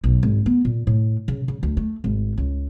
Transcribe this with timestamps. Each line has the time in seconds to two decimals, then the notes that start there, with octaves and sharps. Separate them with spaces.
0.04 B1
0.23 G#1
0.46 B3
0.65 A#2
0.87 A2
1.28 C#3
1.48 C#3
1.63 D2
1.77 A3
2.04 G#1
2.37 C#2